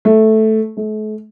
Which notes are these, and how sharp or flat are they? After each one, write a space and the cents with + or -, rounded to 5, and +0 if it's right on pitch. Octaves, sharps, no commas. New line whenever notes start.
A3 -5
A3 -40